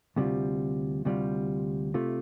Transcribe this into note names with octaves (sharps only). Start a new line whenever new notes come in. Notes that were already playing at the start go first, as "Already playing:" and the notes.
D2 C3 G3 F4
D2 C3 G3 F4
C3 A3 F4